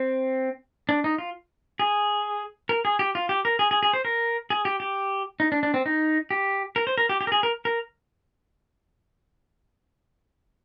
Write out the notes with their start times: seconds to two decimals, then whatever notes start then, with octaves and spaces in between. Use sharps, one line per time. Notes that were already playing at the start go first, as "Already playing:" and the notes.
Already playing: C4
0.89 D4
1.04 D#4
1.18 F4
1.79 G#4
2.69 A#4
2.85 G#4
2.99 G4
3.15 F4
3.29 G4
3.45 A#4
3.59 G#4
3.71 G#4
3.83 G#4
3.93 C5
4.05 A#4
4.50 G#4
4.65 G4
4.80 G4
5.40 D#4
5.52 D4
5.63 D4
5.74 C4
5.86 D#4
6.31 G4
6.76 A#4
6.87 C5
6.98 A#4
7.09 G4
7.21 G4
7.27 A#4
7.32 G#4
7.43 A#4
7.65 A#4